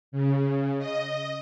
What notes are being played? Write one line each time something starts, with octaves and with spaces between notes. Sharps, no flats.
C#3
D#5